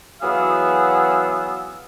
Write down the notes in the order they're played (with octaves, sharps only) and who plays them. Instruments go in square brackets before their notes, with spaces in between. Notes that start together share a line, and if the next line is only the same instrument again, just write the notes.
[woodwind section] E3 F#3 B3 G#4 F5 E6